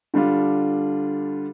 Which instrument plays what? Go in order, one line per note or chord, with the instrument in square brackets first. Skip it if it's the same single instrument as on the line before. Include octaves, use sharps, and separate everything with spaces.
[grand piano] D3 G3 D4 F4